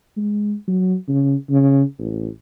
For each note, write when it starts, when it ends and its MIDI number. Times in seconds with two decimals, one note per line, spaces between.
0.16 0.54 56
0.68 0.94 54
1.08 1.35 49
1.49 1.83 49
1.99 2.28 33